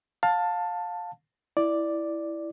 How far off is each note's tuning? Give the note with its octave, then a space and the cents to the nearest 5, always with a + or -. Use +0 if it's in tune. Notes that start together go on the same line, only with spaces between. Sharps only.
F5 +20 A5 +10
E4 +0 D5 +0